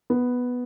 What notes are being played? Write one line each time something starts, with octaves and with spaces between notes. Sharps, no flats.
B3